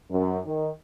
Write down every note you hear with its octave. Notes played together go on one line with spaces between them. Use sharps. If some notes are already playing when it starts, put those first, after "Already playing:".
F#2
D#3